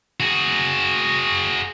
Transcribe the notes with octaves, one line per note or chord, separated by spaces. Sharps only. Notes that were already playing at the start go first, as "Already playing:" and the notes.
F#4 G#4